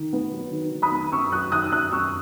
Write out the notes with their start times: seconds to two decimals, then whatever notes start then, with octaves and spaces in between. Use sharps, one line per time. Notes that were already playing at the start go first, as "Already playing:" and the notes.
Already playing: D#3
0.13 B3
0.32 F#3
0.52 D#3
0.72 D#3
0.82 B5 D#6
0.92 B3
1.12 F#2 C#6 E6
1.32 F#3 D#6 F#6
1.52 D#3 D#6 F#6
1.63 E6
1.72 F#2 D#6 F#6
1.92 F#2 C#6 E6